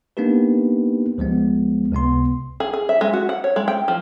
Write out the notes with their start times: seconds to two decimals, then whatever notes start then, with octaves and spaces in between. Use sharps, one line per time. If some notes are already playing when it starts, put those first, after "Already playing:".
0.17 A#3 B3 D4 D#4 G4 B4
1.18 D2 F3 G#3 B3
1.92 C#2 C3 B3 C6
2.60 G#4
2.73 G#4
2.89 E5
3.01 G#3
3.13 F#4
3.29 F#5
3.44 C#5
3.56 G#3
3.68 G5
3.88 F3